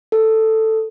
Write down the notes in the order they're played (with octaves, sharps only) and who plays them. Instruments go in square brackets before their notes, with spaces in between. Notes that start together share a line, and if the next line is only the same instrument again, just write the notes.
[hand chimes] A4